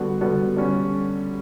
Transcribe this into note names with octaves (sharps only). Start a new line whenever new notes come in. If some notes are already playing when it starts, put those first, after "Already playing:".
Already playing: D3 G3 B3 F#4
D3 G3 B3 F#4
D3 G3 C#4